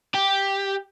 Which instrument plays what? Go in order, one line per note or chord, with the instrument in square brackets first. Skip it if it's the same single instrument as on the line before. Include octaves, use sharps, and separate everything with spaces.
[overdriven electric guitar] G4